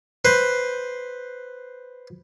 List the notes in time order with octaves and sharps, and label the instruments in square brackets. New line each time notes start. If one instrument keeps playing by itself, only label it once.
[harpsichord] B4 C5